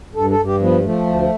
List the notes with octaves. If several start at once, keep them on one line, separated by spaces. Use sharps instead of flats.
G2 A4
A4
G2
G4
F3 B3
F3 A3
D2